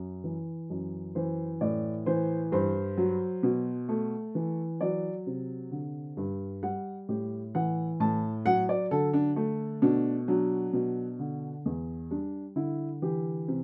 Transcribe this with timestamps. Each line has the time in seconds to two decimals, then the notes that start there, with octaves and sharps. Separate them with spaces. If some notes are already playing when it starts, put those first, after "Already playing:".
Already playing: F#2
0.24 E3
0.70 F#2
1.15 E3 C5
1.61 A2 D5
2.06 E3 C5
2.52 G2 C5
2.98 F#3
3.43 B2
3.89 A3
4.35 E3
4.81 F#3 D5
5.26 C3
5.71 D3
6.17 G2
6.63 G3 F#5
7.09 A2 G4
7.55 E3 F#5
8.00 A2 A5
8.46 F#3 F#5
8.69 D5
8.91 D3 A4
9.13 D4
9.36 A3
9.82 B2 D4
10.28 F#3 D4
10.73 B2
11.19 D3
11.66 E2
12.11 G3 D4
12.56 D3 E4
13.02 E3 G4
13.48 C3